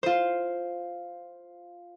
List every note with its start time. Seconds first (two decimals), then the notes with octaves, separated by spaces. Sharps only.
0.03 F4 C5